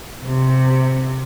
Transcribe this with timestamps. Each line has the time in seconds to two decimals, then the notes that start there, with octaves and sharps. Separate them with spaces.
0.25 C3